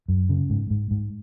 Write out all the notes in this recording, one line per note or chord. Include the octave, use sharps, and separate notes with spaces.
F#2
C#3
G#2
G#2
G#2